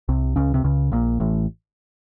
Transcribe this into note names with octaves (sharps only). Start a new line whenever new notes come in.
C2 C3
C#2 C#3
C3
C#2 C#3
A#1 A#2
A1 A2